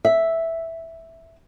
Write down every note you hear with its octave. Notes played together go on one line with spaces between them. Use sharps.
E5